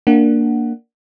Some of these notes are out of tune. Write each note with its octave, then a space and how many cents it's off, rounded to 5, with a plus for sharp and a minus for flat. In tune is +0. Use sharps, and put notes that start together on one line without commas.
A#3 -5 D4 -5 F#5 +10